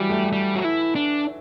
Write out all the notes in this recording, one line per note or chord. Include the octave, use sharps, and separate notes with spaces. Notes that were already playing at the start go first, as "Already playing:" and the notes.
Already playing: E3 F#3 G3
A3
G3
F#4
E4
D4